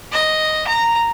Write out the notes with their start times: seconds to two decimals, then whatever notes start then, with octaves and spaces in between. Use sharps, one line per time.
0.12 D#5
0.67 A#5